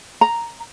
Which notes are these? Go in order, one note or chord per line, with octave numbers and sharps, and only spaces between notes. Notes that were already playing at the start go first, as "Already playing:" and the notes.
A#5